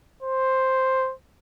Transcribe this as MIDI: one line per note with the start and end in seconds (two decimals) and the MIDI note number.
0.23 1.13 72